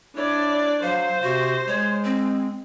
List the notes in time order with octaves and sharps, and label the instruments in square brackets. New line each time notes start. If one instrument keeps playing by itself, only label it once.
[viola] D4 D5 [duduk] E4 [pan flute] C#5
[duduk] F#3 [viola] C5 [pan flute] F5
[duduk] C3 [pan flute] F#4
[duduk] G#3 [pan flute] C#5
[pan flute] C4